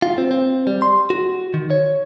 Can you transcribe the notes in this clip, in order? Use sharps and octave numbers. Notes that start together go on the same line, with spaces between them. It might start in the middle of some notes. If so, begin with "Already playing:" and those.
F4
C4
C4
G3
C6
F#4
D#3
C#5